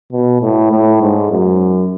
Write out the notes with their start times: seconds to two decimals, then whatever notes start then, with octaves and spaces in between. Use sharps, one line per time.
0.12 B2
0.42 A2
0.72 A2
1.02 G#2
1.31 F#2